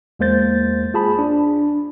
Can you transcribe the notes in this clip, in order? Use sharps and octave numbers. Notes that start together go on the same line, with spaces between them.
E2 G#3 A#3 C5 G6 A6
F4 G#4 A5 B5
D4